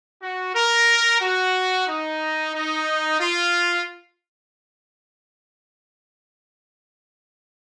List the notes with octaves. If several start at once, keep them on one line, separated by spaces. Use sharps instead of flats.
F#4
A#4
F#4
D#4
D#4
F4